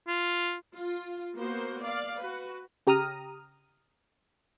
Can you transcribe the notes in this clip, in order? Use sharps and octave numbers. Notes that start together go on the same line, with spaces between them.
F4
F4
A#3 B3 F#4 C5
D5 F5
F#4 B4
C#3 G4 A#5 D#6 F6 D#7